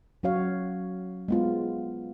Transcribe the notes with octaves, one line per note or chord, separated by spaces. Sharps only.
F#3 C#4 F#4 C#5 F5
G#3 B3 F4